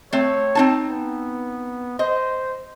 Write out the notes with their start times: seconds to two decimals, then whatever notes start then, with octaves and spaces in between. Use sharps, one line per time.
0.13 A3 C4 C#5
0.55 C4 D#4 A5
0.89 B3
1.99 C5 D#5